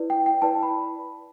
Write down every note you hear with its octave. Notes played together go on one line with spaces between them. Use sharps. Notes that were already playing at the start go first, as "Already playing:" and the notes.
Already playing: E4 B4 D5
G5
G5
E4 B4 D5 A5
B5